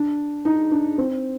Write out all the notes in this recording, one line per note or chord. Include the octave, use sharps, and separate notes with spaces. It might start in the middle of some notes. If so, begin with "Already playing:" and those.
Already playing: D4
D#4
D4
C4